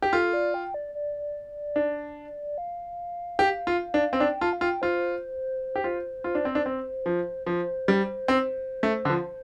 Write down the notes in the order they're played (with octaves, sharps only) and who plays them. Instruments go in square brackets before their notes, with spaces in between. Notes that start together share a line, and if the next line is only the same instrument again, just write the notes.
[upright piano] G4
[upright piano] F4 [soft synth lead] A4
[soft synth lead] D5
G5
D5
D5
[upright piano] D4
[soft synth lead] F5
[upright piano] G4
F4
D4
C4
[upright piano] D4 [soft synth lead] G5
[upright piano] F4 [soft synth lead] A5
[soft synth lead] F5
[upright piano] F4 [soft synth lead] G5
[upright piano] F4 [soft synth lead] C5
[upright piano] G4
[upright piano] F4 [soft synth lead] C5
[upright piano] F4
D4
C4
D4
C4
F3
[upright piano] F3 [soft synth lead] C5
[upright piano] G3
C4
A3
D3
F3